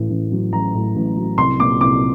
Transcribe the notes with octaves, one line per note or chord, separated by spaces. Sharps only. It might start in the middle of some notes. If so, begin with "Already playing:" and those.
Already playing: A1 A2
A1
F#3
A1 A#5
A2
A1
F#3
C2 C6
A#2 D6
C2 D6